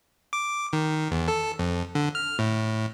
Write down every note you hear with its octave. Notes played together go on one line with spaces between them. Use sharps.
D6
D#3
E2
A4
F2
D3
F6
A2